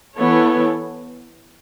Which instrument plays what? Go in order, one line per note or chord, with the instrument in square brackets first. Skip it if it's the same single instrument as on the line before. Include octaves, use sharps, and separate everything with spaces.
[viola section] E3 B3 E4 A4 C#5